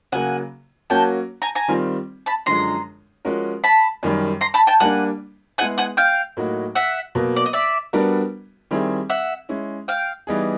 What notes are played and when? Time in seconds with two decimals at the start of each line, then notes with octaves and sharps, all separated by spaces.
0.12 C#3 F#3 A#3 F#5 G#5
0.90 F#3 A#3 C#4 F#4 G5 A5
1.42 G#5 A#5
1.55 G#5 A#5
1.68 D#3 G3 C4 F4
2.26 A5 B5
2.46 F#2 D3 F3 G#3 A#5 C6
3.25 F3 G#3 C#4 F#4 A#4
3.64 A5 B5
4.03 F#2 D#3 G3
4.41 A#5 C6
4.54 A5 B5
4.67 G5 A5
4.80 G3 A#3 D4 F#5 G#5
5.58 G#3 B3 E4 G#4 F#5 G#5
5.78 F#5 G#5
5.97 F5 G5
6.37 A2 F#3 A#3 D#4 F#4
6.75 E5 F#5
7.15 B2 F#3 A#3
7.36 D5
7.46 D#5
7.53 D5 E5
7.93 G3 B3 D4 F#4 A#4
8.71 D#3 G3 C4 E4 G#4
9.10 E5 F#5
9.49 G#3 C#4 E4
9.88 F5 G5
10.27 E3 G3 B3 D#4 G#4